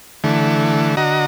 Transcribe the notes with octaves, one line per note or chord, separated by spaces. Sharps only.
D3 E3 A3
D3 F#4 D#5 A#5